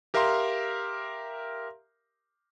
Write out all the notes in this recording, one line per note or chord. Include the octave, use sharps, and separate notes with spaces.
G4 A#4 E5 F5 A#5 C6